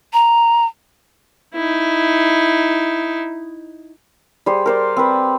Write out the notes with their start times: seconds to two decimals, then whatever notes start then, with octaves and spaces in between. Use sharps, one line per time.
0.13 A#5
1.54 D#4 E4
4.46 G3 G#4 C5 C#6
4.66 A#4 C5 D5
4.97 C4 B4